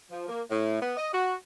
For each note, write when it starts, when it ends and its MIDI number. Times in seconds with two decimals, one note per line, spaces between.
0.11 0.26 53
0.29 0.42 58
0.50 0.79 45
0.82 0.93 59
0.97 1.10 75
1.13 1.34 66